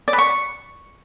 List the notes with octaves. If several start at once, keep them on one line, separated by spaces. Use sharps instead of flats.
D5
B4
C#6